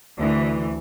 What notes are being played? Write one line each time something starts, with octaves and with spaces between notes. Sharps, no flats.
D2 E3